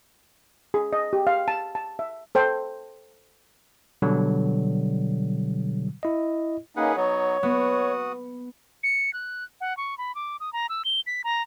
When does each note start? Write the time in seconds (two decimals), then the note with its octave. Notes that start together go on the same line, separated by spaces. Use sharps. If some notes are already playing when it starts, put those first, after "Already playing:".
0.74 G#4
0.93 D#5
1.13 G4
1.27 F5
1.48 A5
1.75 A5
1.99 E5
2.35 A4 C5 G5
4.02 B2 D3 F#3 G3
6.03 E4 D#5
6.77 A#3 C#4 D#4 G#4 B4 F#5
6.97 F#3 B3 D#4 C#5
7.43 B3 F#4 D#6
8.83 C#7
9.13 F#6
9.61 F#5
9.77 C#6
9.98 B5
10.15 D6
10.40 D#6
10.53 A#5
10.69 E6
10.85 G7
11.07 B6
11.24 A#5